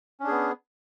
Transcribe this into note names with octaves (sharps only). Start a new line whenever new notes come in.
B3 C#4 D4 G#4